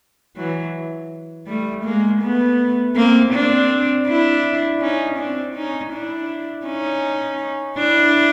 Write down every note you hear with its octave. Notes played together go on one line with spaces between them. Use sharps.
E3 F#3
G3 A3
G#3 A#3
A3 B3
A#3 C4
C4 D4
D4 E4
C#4 D#4
C4 D4
C#4 D#4
D4 E4
C#4 D#4
D4 E4